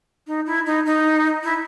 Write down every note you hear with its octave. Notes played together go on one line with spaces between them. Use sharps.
D#4
E4
D#4
D#4
E4